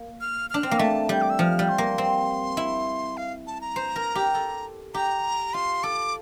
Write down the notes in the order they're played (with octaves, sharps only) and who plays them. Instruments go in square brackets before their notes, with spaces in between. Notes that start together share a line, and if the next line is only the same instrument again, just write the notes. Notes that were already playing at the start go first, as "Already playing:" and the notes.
Already playing: [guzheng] A#3
[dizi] F6
[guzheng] D4 [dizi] F6
[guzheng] C4
A#3
[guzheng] A3 [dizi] A5
[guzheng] G3 [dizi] G6
[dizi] D6
E6
[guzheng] F3 [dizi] F6
[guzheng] G3
[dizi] C6
[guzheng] A#3
C4
E4
[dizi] F5
A5
A#5
[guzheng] C5
A#4
G4
A4
[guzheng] G4 [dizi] A#5
[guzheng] F4 [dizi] C6
[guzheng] A4 [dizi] D6